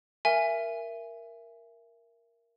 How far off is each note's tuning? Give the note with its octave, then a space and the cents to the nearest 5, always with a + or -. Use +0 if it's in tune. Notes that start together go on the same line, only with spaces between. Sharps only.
A#4 +0 E5 +20 G#5 +0